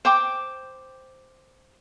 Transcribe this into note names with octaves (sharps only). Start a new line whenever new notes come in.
C5 G5 D6